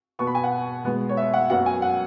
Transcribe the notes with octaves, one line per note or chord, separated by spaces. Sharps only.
B2 B3 C#6
B5
G#5
F#5
B2 G#3 B3
C#5
E5
F#5
F#2 F#3 B3 F#5
G#5
F#5